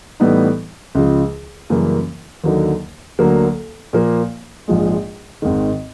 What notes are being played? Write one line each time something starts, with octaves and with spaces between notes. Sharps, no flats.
A2 E3 G3 B3 D#4
C#2 C#3 F3
F#2 C#3 E3 G3 A#3
D#2 D3 F#3 A#3 D#4
D2 D3 F#3 A#3
A#2 F3 A#3
A#1 G#2 F3 G#3
G#1 G#2 D#3